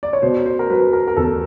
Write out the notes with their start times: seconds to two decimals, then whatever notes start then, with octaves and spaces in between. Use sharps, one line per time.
0.03 D5
0.13 C#5
0.22 B2 C5
0.46 C5
0.59 A#4
0.70 F#3 B4
0.93 A#4
1.08 A#4
1.17 E2 A4